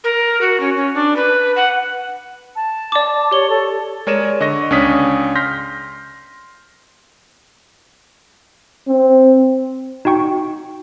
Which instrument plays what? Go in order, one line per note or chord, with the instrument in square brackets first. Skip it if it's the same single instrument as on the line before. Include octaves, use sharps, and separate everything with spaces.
[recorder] A#4
F#4
C#4
C#4
D4
B4
F#5
[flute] A5
[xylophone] D5 D6
[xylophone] G4 G7 [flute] C#5
[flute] A4
[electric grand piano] G#3 A#4 C#5 D5 D#7 E7
D3 D#5 C#6 A#6
C#2 C#4 D4 C#5 D#6 B6
C6 F6 G6 A#6 B6
[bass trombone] C4
[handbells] D#4 F#4 G5 C#6